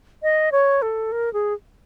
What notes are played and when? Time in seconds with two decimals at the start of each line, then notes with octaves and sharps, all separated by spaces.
0.23 D#5
0.52 C#5
0.82 A4
1.12 A#4
1.33 G#4